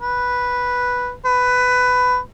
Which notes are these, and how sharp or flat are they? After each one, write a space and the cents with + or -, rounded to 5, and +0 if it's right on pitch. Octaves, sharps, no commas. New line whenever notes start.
B4 -5
B4 +15